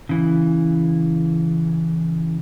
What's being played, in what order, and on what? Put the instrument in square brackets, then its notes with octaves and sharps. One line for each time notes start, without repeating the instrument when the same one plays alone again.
[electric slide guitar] C#3 E3